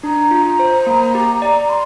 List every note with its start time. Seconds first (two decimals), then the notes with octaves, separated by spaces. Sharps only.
0.03 D4 A#5
0.31 F4
0.59 C5
0.87 A#3
1.15 G4
1.42 D5
1.69 C6